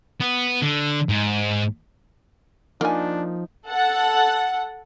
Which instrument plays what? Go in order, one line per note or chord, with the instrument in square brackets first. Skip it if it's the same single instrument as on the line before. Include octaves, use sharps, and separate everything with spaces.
[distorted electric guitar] B3
D3
G#2
[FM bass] F3 [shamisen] A#3 G#5 [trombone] D4 [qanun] D#4
[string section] A4 F#5